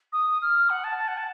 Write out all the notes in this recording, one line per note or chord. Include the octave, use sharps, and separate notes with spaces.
D#6
F6
F#5
A5
A5
F#5
A5